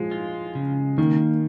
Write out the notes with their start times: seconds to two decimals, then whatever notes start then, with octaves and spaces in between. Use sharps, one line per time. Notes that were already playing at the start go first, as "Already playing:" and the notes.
Already playing: F3 G#3
0.11 F4
0.55 C#3
0.98 D#3 A#3